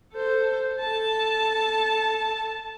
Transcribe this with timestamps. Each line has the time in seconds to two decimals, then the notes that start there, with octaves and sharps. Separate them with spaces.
0.13 A4 C5
0.80 A4 A5